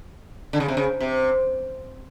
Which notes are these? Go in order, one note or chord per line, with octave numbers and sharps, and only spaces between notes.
D3
C#3
C3
C#3
C3